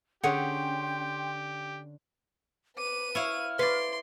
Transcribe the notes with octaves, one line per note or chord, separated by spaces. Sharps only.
D3 C#4 G4 G#4 C#5 F#5 G5 C6
B4 D6 D#7
E4 C#5 F5 F6
B4 C#5 D5 C6